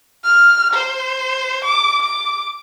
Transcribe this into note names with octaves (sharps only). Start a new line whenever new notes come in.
F6
C5
D6
D6